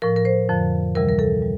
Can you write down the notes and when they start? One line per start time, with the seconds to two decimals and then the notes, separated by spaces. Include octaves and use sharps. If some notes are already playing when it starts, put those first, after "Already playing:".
0.02 A2 F3 A#4
0.16 A#4
0.25 C5
0.49 F2 D3 F3
0.95 D2 C3 E3 G3 A#4
1.09 A#4
1.19 A4
1.42 G3